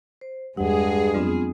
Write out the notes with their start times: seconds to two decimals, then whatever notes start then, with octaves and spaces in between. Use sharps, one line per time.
0.21 C5
0.57 E2 G2 G3 G#3 G#4 F#5
1.14 F2 F#3 B3 C4 D4 F4